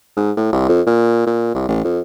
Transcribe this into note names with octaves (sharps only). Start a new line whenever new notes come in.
G#2
A2
C2
F2
A#2
A#2
C2
A1
F2